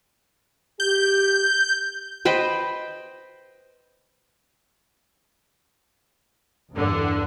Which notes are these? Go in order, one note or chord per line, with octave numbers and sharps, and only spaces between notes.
G4 G6
B4 C5 D#5 G5
E2 G2 D3